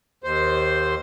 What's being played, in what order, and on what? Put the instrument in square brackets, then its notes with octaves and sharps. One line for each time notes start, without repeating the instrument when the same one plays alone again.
[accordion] D#2 C5